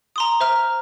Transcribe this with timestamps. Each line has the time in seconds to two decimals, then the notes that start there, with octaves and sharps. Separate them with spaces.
0.16 A#5 C6 D#6
0.40 C5 E5 A#5 F6